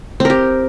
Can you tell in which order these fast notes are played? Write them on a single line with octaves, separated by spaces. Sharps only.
C4 A#4 G4